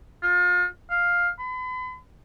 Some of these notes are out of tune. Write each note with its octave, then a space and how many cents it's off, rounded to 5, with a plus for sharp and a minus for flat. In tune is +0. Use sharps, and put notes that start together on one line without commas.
F4 +35
F5 +5
B5 +40